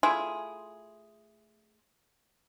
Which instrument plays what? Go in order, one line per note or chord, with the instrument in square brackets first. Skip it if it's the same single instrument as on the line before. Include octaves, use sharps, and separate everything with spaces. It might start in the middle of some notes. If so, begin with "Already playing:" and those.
[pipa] A3 E4 F4 G#4